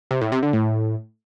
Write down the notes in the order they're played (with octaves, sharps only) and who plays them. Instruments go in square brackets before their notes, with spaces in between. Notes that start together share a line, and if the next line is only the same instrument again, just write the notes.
[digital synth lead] C3
A2
C3
D3
A2